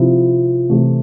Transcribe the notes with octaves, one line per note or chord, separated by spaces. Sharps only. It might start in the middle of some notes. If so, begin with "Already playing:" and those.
Already playing: C3 F3 C4 E4
C3 E3 A3